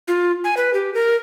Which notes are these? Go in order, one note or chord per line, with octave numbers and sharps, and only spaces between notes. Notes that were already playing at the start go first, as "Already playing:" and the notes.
F4
G#5
B4
G4
A#4